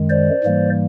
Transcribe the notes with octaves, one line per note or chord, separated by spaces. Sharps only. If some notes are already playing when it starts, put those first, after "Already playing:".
Already playing: F#2 D#3 G#3
C5 D5
G#2 E3 G3 A#3